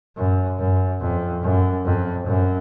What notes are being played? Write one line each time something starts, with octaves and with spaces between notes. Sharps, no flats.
F#2
F#2
F2
F#2
F2
F#2